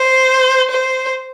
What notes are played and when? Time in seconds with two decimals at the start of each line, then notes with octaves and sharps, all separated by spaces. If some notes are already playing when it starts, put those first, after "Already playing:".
Already playing: C5
0.70 C5